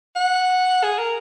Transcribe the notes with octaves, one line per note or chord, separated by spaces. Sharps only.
F#5
G#4
A#4